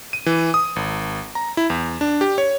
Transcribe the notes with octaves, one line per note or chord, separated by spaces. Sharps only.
D#7
E3
D#6
G#1
A#5
E4
E2
D4
G4
C#5